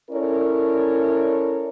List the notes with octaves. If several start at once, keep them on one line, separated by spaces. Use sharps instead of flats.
C#4 E4 A4 A#4 C#5 D5